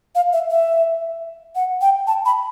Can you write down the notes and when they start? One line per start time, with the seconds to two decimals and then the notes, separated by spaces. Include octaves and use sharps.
0.15 F5
0.33 E5
0.50 E5
1.55 F#5
1.82 G5
2.07 A5
2.26 B5